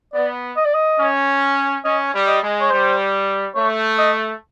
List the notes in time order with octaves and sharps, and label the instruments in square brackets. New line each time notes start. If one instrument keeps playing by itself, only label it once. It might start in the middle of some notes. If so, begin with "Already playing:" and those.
[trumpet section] B3 [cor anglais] D5
[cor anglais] D#5
D5
D#5
[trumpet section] C#4
[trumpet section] C#4 [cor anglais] D#5
[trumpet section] G3
[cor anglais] D#5
[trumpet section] G#3
[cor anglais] C#5
[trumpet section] G3 [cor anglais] C5
[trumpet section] A3 [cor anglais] C#5
[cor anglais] D#5